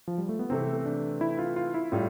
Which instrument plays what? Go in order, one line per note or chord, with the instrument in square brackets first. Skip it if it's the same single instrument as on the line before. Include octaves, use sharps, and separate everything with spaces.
[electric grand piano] F3
G3
A3
B3
[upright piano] C3 E3 A3 [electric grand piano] C4
[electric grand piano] D4
E4
F4
F4
E4
[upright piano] A2 G3 [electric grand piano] F4